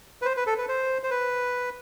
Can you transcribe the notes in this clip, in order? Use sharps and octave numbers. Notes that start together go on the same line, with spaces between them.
B4
C5
B4
A4
B4
C5
C5
B4